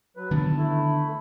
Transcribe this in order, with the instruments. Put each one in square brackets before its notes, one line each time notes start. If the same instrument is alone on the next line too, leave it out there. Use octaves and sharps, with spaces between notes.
[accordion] F#3 B4
[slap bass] D3 D#3 B3 [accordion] A5
[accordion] A3 E4